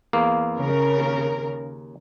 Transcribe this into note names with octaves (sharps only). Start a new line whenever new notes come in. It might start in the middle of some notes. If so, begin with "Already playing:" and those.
E2 A#3 F5
C#3 A#4
D#2